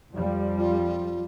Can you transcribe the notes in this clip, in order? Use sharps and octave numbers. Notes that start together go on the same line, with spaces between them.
F2 F3 G3
F4